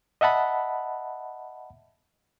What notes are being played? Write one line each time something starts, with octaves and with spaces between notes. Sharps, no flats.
D#5 E5 F#5 A5 B5